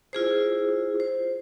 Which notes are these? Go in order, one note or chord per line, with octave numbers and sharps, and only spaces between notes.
E4 F4 G#4 C5
C5